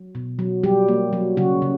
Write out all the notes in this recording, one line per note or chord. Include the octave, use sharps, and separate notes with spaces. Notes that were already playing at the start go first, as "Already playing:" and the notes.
Already playing: F#3
B2
F#3
F#3 G3 G4
A#3
F#3
C#3 F#3 F#4
C#3